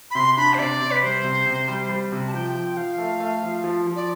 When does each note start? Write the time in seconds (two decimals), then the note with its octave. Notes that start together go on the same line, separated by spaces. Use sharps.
0.11 B5
0.15 C3 C6
0.37 D4 B5
0.54 C5
0.58 C3 D5
0.81 C3
0.91 B4
1.02 G3 C5
1.24 C3
1.46 C3
1.68 G3
1.89 G3
2.12 C3
2.27 A5
2.34 F3 G5
2.55 F3
2.73 G5
2.77 F3 F5
2.98 A3
3.20 A3
3.43 F3
3.64 F3
3.87 F3
3.96 D5